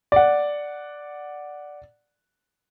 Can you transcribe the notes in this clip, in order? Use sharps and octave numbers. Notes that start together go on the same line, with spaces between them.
D5 F#5